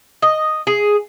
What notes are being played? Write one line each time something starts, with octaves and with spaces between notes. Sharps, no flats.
D#5
G#4